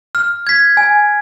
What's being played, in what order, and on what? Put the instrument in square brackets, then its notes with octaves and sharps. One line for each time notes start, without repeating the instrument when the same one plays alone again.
[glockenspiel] F6
G#6 B6
G#5